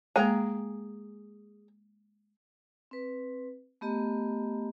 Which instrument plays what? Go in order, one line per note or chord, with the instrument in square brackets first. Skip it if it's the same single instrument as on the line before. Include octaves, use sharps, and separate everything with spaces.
[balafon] G#3 A#3 [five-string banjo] G#4 G5 A#5
[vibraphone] C4 B4
A3 B3 G4 D#5 A#5